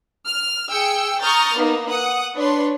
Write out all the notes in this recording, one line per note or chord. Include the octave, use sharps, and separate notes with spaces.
F6
G#4 G5 E6 C#7
A#5 C#6 D#6 F6 G6 A6
A#3 B3 D#4
F#5 D#6
D4 B4 C#5 C6